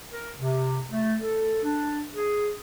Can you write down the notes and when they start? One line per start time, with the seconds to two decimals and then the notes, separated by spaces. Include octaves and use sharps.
0.11 A#4
0.37 C3
0.90 A3
1.21 A4
1.63 D4
2.13 G#4